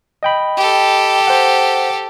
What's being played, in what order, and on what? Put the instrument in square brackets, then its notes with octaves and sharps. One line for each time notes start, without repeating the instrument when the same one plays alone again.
[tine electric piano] D#5 G5 B5
[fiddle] G4 A4
[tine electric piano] C5 F#5